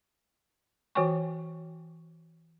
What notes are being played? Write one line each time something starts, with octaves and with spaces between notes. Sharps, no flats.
E3 F#4 C#5 G5 G#5 C#6